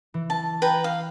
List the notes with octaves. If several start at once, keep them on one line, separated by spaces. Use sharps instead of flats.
E3
A5
B4 G5 A#5
F5